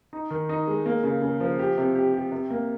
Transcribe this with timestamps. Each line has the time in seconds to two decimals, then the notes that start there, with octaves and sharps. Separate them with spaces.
0.13 D#4
0.30 D#3
0.49 D#4
0.68 G#3
0.86 A#3
1.04 C#3
1.22 C#3
1.40 F3
1.59 G4
1.78 C3
1.95 G4
2.14 G4
2.32 C3
2.50 A#3